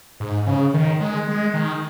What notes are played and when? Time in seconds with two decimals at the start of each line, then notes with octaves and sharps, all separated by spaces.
0.20 G#2
0.47 C#3
0.74 D#3
1.00 G#3
1.28 G#3
1.54 D#3